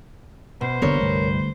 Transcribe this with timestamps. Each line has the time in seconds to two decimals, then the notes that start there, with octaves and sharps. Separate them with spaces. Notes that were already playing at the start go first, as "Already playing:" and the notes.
0.61 B2 B4 C5
0.82 E1 G2 D3 A#3 B3 A#4 C#5
1.01 C2 G2 D3 G3 A3